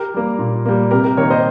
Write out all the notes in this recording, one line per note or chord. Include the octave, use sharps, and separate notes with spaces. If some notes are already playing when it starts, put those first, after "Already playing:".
Already playing: G4 A#4
G3 A#3
A#2
G3 A#3
C3 G4 A#4
G4 A#4
D#3 A#3 A#4 C#5
C5 D#5